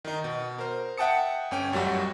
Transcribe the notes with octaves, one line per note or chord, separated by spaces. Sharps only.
D#3 D#4
B2
A#4 C5
E5 F#5 G5 A5 D#6 C#7
G1 C#4 G5
A1 F#2 F#3 G3 F#4